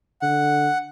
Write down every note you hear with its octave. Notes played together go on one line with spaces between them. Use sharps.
D3 F#5